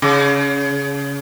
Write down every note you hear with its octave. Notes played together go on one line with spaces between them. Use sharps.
C#3